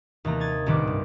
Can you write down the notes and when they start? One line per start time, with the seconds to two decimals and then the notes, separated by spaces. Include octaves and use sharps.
0.25 D#2 C3 E3 A3 A#5
0.40 D#6 G#6 A6
0.66 D#1 C2 A2 D#3 B4 D6
0.87 G2